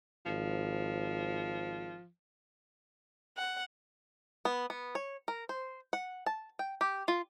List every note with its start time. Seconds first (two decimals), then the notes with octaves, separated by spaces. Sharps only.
0.26 G#1 F3
3.37 F#5
4.45 B3
4.70 B3
4.95 C#5
5.28 A#4
5.49 C5
5.93 F#5
6.26 A5
6.59 G5
6.81 G4
7.08 F4